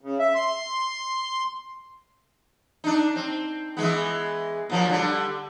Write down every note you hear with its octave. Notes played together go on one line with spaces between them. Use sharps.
C#3
E5
C6
D4 D#4
C4
E3 G#3 B3
A#2 F3 F#3
D3 G3